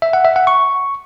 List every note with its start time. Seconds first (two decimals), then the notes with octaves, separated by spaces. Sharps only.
0.02 E5
0.13 F#5
0.25 E5
0.36 F#5
0.47 C#6